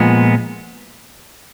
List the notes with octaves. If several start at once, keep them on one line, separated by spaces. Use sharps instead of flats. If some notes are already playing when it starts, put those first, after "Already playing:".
Already playing: A#2 F3 G#3 B3